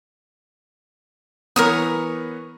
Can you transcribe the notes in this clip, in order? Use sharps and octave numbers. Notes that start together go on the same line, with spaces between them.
E3 B3 A#4 C#5 D#6